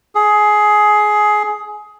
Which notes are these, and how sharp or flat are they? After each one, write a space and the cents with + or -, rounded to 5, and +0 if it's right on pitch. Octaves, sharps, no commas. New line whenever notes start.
G#4 +15